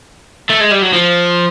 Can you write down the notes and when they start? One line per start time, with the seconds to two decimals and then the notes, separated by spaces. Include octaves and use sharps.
0.50 A3
0.60 G#3
0.71 G3
0.82 F#3
0.93 F3